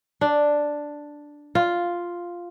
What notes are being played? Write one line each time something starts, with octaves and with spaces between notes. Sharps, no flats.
D4
F4